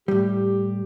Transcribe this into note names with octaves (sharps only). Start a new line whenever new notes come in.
A2 G3 G4